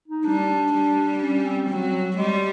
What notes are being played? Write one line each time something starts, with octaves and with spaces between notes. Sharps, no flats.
D#4
G3 D4
G3
C#4
C4
F#3 C4
G3 G#3